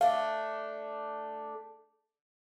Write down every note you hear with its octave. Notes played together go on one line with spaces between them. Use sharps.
A3 D4 F5